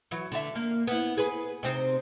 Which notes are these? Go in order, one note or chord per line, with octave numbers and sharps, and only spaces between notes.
E3 F#3
D3 E5
A#3
B3 E4
G#4 B4
C3 C4 D#4